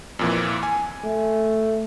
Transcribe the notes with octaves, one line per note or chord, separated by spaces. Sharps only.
F2 A#2 E3
G#5
A3